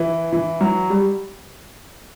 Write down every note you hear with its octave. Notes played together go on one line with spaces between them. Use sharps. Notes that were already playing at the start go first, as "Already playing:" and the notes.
Already playing: E3
E3
F#3
G3